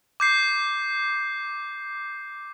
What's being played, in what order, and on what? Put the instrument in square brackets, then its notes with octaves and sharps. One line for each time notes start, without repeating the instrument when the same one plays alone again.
[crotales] D6 G6 C7